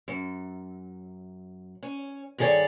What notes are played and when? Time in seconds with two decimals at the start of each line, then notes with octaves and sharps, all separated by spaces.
0.08 F#2
1.83 C#4
2.38 G2 D#3 G#4 A4 C#5 D5